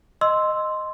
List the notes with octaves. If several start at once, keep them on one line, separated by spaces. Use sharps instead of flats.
D#5 C6 E6